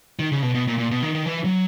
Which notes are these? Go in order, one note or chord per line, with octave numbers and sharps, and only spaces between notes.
D#3
C#3
B2
B2
A#2
A#2
B2
D#3
D#3
E3
F#3